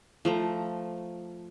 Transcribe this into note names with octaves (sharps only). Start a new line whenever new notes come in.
F3 A3 A#5